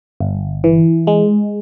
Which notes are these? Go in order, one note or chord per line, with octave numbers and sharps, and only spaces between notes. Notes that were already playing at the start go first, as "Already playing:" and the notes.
G1
E3
G#3